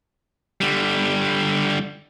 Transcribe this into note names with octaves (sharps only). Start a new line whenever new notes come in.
D3 G3